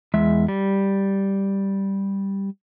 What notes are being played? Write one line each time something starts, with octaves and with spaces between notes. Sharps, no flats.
E2 G#3 E5
G3